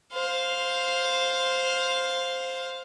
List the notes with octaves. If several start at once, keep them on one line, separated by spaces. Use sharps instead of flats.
C5 F5